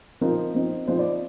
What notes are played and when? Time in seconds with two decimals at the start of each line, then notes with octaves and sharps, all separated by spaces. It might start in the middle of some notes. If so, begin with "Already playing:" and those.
0.21 F3 C4 D#4 A#4
0.55 F3 C4 D#4
0.87 F3 C4 D#4 C5
0.98 D5